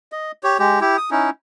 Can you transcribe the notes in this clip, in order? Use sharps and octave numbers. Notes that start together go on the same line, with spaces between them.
D#5
G4 C#5
G#3 G4
E4 G4
D#6
C#4 D#4 E4